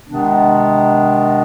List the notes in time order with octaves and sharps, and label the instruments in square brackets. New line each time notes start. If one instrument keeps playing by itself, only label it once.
[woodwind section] C3 D#3 G#3 B3 D4